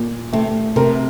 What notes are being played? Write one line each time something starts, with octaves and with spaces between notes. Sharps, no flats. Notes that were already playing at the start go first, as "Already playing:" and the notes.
Already playing: A#2
C3 A3
C3 A#4